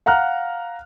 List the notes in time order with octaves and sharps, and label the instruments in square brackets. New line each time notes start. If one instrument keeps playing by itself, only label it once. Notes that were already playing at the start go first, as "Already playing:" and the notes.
[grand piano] F5 F#5 A#5 F6 F#6